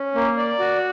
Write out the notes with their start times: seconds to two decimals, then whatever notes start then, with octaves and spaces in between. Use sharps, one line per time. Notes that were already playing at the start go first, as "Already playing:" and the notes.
Already playing: C#4
0.15 A#3
0.37 D5
0.59 F#4